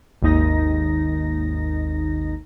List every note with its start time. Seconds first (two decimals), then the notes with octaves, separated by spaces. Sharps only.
0.22 G#1 D#2 D#4 A#6